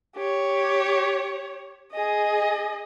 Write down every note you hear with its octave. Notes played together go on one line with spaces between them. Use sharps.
G4 C#5
G#4 D#5